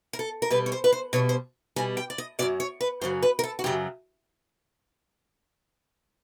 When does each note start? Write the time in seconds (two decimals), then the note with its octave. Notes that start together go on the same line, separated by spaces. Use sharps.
0.13 A#4
0.19 A4
0.42 A#4
0.50 B2 G3 B4
0.66 C#5
0.72 C5
0.84 B4
0.93 C5
1.13 B2 G3 C#5
1.29 C5
1.76 B2 G3 G#5
1.97 G5
2.10 D5
2.18 D#5
2.39 F#2 C#3 F#3 D5
2.60 C#5
2.81 B4
3.01 F#2 C#3 F#3 C5
3.22 B4
3.39 A#4
3.44 A4
3.59 F#4
3.64 F#2 C#3 F#3 G4